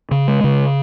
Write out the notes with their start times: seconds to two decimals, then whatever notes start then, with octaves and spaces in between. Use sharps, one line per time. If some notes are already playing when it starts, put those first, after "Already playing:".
0.11 C#3
0.28 G#3
0.44 C#3